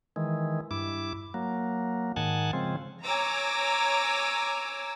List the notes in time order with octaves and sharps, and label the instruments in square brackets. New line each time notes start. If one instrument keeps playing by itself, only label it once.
[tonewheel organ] D#3 E3 G#3
G2 E4 D6
F#3 A#3
G#2 D#3 F#5 G#5 A5
C#3 F3 G#3 C4
[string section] C#5 G#5 A#5 D6 E6